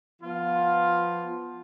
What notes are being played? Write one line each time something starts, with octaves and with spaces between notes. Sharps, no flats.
F3 B3 F4